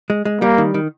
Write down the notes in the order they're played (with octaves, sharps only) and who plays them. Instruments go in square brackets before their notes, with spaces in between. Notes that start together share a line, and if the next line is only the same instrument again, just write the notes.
[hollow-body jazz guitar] G#3
G#3
[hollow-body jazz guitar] G3 [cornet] A#3
[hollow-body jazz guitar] D#3
D#3